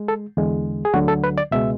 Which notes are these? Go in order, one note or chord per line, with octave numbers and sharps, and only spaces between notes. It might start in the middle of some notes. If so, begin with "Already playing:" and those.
Already playing: G#3
A4
E2 D3 G#3
G#4
D2 D3 F#3 F#4
A4
B4
D5
C#2 B2 G#3 E5